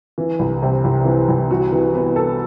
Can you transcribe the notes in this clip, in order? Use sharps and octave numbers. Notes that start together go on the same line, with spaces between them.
E3
C2
C3
C2
E3
C2
F#4
E3
B3
A4